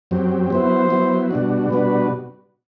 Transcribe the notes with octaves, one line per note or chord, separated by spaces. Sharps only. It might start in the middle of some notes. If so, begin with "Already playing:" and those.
F#2 F#3 C4 G4
F#3 B3 E4 C5
F#3 B3 E4
B2 G3 D4 F#4
B2 G3 D4 F#4 B4